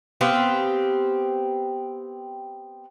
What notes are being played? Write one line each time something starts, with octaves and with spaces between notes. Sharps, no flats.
B3 C4 G4 F5